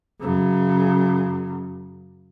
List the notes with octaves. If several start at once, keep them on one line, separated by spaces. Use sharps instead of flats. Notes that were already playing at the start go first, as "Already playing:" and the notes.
F#2 C#3